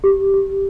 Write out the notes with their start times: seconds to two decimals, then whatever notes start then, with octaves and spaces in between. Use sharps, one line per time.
0.04 G4
0.34 G4